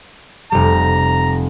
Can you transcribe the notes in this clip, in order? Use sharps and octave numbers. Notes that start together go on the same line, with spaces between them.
F1 G3 A#5